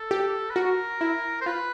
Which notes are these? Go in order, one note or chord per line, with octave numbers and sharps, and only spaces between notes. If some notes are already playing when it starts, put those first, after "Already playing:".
Already playing: A4
G4
B4
F#4 A#4
E4
C5
F4 B4